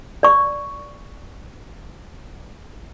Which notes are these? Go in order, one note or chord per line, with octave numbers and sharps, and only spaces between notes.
D5 C#6